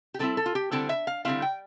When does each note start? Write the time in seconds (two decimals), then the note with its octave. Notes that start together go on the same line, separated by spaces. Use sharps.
0.14 G4
0.19 D3 G3 C4 E4 A4
0.37 A4
0.46 F4
0.55 G4
0.72 D3 G3 C4 E4 A4
0.89 E5
1.07 F5
1.25 D3 G3 C4 E4 F5
1.42 G5